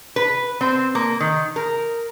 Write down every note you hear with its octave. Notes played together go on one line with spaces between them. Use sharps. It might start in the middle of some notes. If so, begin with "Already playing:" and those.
B4
C4
A#3
D#3
A#4